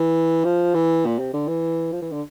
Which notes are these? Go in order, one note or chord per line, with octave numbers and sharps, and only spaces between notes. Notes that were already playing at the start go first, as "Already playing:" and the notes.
Already playing: E3
F3
E3
A#2
C3
D3
E3
F3
E3
D3